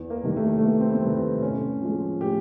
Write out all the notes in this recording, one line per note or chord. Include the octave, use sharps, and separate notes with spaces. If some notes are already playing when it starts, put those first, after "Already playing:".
Already playing: E2
A#3
C3 D#3 G3
A3
A3
E2 A#3
C4
B3
C3 D#3 G3
C4
A2 C#4
F3 G#3
A2 G4